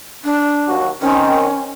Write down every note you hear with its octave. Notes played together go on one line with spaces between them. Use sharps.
D4
D#2 F#3 F#4
D#3 C4 C#4